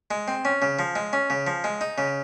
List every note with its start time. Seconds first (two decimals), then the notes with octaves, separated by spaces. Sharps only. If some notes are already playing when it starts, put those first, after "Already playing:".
0.11 G#3
0.28 C4
0.45 C#4
0.62 C#3
0.79 F3
0.96 G#3
1.13 C#4
1.30 C#3
1.47 F3
1.64 G#3
1.81 D#4
1.98 C#3